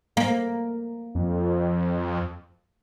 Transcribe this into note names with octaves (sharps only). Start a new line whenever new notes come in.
A#3
F2